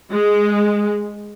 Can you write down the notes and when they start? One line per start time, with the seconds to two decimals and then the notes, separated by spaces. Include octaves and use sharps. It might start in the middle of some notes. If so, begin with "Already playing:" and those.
0.11 G#3